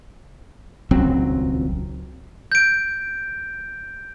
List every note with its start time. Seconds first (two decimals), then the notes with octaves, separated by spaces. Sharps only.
0.91 D#1 C#2 F#3 C4
2.52 G6 D7